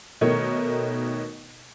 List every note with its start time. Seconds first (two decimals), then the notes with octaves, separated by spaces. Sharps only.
0.21 B2 D#3 A3 D#4 A#4 C#5